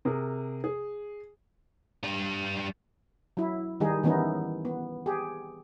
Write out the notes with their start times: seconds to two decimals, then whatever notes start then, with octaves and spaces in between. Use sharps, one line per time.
0.05 C3 G#4 A#4
0.64 G#4
2.04 G3 D4
3.37 F#3 E4
3.80 D#3 G3 D#4 G#4
4.03 D#3 E3 B3 C#4 D#4 E4
4.65 B3
5.06 G4 G#4